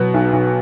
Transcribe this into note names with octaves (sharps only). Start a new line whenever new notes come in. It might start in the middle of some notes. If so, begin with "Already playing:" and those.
Already playing: B2 F#3 B3
B1
B1